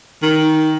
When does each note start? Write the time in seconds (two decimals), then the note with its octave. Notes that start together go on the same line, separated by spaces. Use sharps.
0.22 D#3